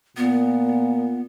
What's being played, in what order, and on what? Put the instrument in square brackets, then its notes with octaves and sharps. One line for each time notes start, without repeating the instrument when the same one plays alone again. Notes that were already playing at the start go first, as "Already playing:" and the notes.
[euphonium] A#2 [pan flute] B3